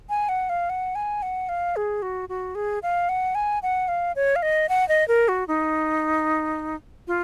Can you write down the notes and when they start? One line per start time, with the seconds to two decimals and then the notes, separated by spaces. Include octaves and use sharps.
0.09 G#5
0.29 F#5
0.49 F5
0.70 F#5
0.95 G#5
1.22 F#5
1.49 F5
1.76 G#4
2.02 F#4
2.29 F#4
2.55 G#4
2.83 F5
3.09 F#5
3.35 G#5
3.63 F#5
3.88 F5
4.16 C#5
4.36 F5
4.42 D#5
4.69 F#5
4.89 D#5
5.08 A#4
5.28 F#4
5.48 D#4
7.08 F4